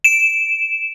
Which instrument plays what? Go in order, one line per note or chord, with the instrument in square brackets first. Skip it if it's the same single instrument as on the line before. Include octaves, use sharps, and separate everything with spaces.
[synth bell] D7 E7